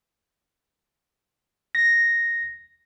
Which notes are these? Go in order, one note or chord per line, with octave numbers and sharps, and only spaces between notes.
A#6